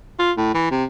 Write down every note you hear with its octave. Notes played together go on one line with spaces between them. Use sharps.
F4
A2
E3
C3